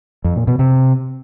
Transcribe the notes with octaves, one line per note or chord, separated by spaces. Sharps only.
F2
A#2
B2
C3